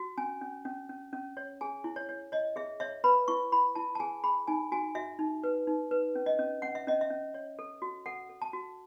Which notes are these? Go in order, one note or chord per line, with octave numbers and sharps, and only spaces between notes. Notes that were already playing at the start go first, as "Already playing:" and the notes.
Already playing: F#4
C#4 G#5
C#4
C#4
C#4
C#4
C#5
G#4 G#5
E4
C#5
C#5
C#5 D#5
G#4 E5
C#5 E5
B4 B5
E4 C#6
E4 B5
E4 A5
A5
G#4 G#5
G#4 B5
D#4 G#5
F#4 G#5
F#4 E5
D#4
B4
D#4
B4
C#4
D#5
C#4
C#4 F#5
E5
C#4 D#5
E5
C#4
C#5
A4
F#4
A4 F#5
A4
A5
F#4